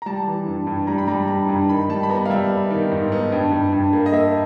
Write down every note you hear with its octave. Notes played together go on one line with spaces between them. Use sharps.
A#5
G3 A5
E3
G2
G2
G3 A#5
B5
G3 A#5
G2 A#5
G2
D#3 B5
G3 A5
B5
B3 A#5
F5
G3 E5
B3
D#3
G#2
B3
G2
G2
G2
A#3
D#5
A#3 E5